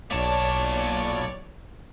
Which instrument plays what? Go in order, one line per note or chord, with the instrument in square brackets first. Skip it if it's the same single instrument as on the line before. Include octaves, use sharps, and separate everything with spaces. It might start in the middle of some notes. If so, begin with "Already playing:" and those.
[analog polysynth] B1 C#5 D5 [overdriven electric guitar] A#2 A5